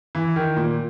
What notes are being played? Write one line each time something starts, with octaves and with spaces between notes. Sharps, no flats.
E3
D#3
A#2